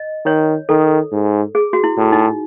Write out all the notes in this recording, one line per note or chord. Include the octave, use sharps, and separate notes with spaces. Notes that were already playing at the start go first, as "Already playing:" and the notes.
Already playing: D#5
D#3 C#5
D#3 A4
G#2
G#4
F#4
E4
A2
D#4